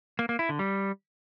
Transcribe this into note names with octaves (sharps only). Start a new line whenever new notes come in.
A#3
A#3
E4
D3
G3